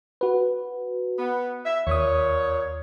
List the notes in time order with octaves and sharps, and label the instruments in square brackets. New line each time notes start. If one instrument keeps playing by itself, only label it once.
[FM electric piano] F#4 B4
[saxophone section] B3
E5
[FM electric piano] D#2 D#6 [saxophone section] A#2 C#5